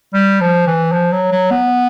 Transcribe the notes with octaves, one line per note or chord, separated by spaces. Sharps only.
G3
F3
E3
F3
F#3
F#3
B3